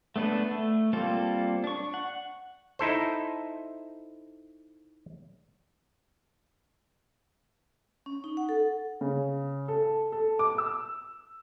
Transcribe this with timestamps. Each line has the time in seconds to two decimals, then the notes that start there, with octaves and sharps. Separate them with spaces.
0.16 A3 B3 D4 A4 B4
0.51 A3
0.93 G3 A#3 C4 F4 A4
1.64 D4 C#6
1.94 F#5
2.79 D#4 E4 A4 C5
8.06 C#4
8.24 D#4
8.37 F#5
8.49 A4
9.01 C#3
9.68 A4
10.12 A4
10.39 D6
10.58 E6